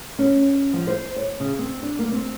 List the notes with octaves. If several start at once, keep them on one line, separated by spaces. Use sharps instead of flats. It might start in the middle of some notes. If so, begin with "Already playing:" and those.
C#4
F3
C5
C#5
C#3
C4
D4
A#3
C4